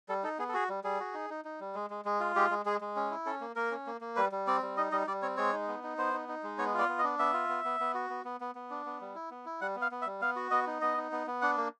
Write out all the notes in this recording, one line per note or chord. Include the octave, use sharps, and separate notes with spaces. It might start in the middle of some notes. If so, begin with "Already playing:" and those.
G3 A4
D#4 A4
B3 G#4
A4
F#4 G#4
G3
G3 G#4
F#4
D#4
D#4
D#4
G3
G#3
G#3
G#3
F4
G#3 G4
G#3
G#3 G#4
G#3
C#4
E4
C#4 A4
A#3
A#3 A#4
C#4
A#3
A#3
G3 B4
G3
C4 D5
G3
D#4 D#5
G3 D#5
G3 D5
C4 C#5
G#3 C#5
D#4
B3
D#4
B3 C5
D#4
D#4
G#3
B3 C#5
F4 D5
B3
D#5
D4
B3 E5
F4
B3
B3
B3
F#4
B3
B3
B3
B3
D4
B3
G3
E4
B3
E4
G3 F#5
B3
F5
B3
E5
G3
B3 F5
F#4
B3 D#5
D#4
B3 D#5
D#4
B3
B3
D4 F#5
A#3